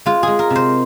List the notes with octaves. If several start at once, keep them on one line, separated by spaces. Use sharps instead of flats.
G#3 F4
G#3 G#4
A#4
C3
C5